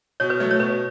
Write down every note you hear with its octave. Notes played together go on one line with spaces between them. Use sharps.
B2 C#5
B4
F#3 A3
C#5
B2 B4